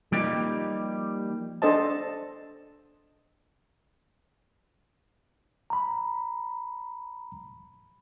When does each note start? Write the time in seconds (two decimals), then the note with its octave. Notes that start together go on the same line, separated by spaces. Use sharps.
0.12 F3 G3 A#3 D#4 G4
1.62 D4 A4 C5 D#5 A5
5.70 A#5 B5